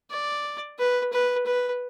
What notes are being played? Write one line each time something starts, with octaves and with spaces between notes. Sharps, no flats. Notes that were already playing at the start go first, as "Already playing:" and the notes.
D5
B4
B4
B4